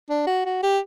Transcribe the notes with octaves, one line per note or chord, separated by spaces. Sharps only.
D4
F#4
F#4
G4